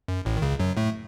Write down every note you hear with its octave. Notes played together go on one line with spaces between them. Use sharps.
F#2
A1 A2
D#3
C#2 C#3
F#2 F#3
A2 A3